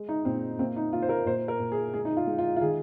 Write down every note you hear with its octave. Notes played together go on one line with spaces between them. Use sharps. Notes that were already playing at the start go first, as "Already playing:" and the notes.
Already playing: G#3
D#4
A#2 C4
A#3 C4
D#4
A#3 F4
C5
A#4
A#2 C5
A#4
A#2
G#4
G#3 G#4
D#4
F4
G#3
F4
F4
D#3 G#4